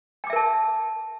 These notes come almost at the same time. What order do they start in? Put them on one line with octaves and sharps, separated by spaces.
G5 D6 E5 A#4 A5